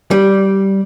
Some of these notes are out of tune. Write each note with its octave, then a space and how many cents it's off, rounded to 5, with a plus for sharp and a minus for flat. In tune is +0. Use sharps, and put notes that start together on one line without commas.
G3 -10